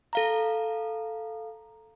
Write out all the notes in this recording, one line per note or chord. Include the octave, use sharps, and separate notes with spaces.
A4 F5 A#5